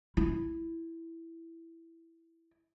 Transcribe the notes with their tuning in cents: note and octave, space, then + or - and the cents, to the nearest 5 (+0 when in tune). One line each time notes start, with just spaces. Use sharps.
E4 +5